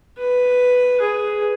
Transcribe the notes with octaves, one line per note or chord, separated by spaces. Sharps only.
B4
G#4